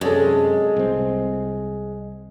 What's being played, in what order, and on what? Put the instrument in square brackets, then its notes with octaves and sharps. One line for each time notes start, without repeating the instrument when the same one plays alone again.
[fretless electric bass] F#2 C3 [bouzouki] G#3 [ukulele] A4 C#5 D5
[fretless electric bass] C2 C4